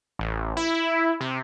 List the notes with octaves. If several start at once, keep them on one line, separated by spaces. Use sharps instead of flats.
A1
E4
C3